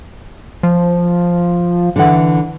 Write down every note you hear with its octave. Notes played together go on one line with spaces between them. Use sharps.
F3
D3 E3 F#5